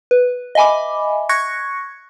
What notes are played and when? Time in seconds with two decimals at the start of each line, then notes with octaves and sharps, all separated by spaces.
0.11 B4
0.55 D#5 E5 G#5 B5 D6
1.29 C#6 F#6 G#6 A#6 C#7